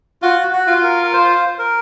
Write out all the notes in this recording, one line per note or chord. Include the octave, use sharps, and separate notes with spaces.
F4 F#4
F#4
F4
A#4
A#4
C5
A#4